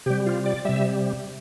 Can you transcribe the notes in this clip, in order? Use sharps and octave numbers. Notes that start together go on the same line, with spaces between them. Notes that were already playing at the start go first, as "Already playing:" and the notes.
C3 G3 G4
F4
D5
C3 G3 E5